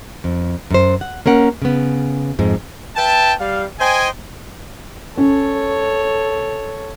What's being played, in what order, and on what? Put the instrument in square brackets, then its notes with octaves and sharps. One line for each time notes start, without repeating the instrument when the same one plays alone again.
[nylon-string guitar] F2
F#2 C5
F#5
A#3 C#4 A#4 F#5
C#3 B3
F2 G#2 G#3
[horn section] B4 E5 G5 A5
G3 F5
C5 D#5 G5 G#5
[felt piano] C#4 [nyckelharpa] A4 C#5